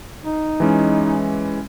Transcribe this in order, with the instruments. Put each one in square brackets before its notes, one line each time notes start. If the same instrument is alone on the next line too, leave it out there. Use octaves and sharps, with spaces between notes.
[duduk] D#4
[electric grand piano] E3 G#3 C#4